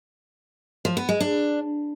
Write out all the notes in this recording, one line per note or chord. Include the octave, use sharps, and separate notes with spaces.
F3
B3
G#3
D4